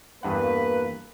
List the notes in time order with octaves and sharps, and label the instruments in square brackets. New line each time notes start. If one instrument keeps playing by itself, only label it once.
[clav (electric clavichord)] E2 G2 F#5 [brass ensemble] A#3 B4